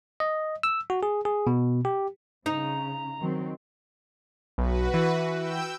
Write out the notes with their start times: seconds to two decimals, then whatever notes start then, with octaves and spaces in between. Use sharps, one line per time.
0.20 D#5
0.63 E6
0.90 F#4
1.03 G#4
1.25 G#4
1.47 B2
1.85 G4
2.46 C#3 D#4 A#5
3.20 D#3 F#3 C4
4.58 B1 F#4 B4
4.94 E3
5.35 G5 E6 G6